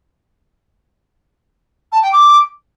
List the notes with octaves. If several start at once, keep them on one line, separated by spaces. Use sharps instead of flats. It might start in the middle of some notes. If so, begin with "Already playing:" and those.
A5
G5
D6